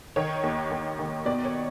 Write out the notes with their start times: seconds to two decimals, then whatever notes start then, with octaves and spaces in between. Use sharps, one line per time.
0.16 D#3 C#5
0.43 D#2
0.71 D#2
0.99 D#3
1.25 B2 D5
1.45 C#5